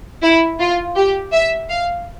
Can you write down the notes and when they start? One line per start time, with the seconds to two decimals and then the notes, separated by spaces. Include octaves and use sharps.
0.22 E4
0.59 F4
0.96 G4
1.32 E5
1.69 F5